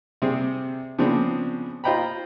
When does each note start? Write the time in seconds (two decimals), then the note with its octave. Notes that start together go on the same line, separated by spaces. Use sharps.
0.22 C3 G3 C4 G#4
0.99 C#3 F3 B3 C4 D4
1.84 F4 C5 D#5 G5 A#5 B5